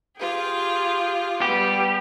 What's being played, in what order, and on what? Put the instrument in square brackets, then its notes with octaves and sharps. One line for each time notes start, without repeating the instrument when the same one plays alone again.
[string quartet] F4 G4 G#4
[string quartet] G3 B3 [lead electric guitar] G4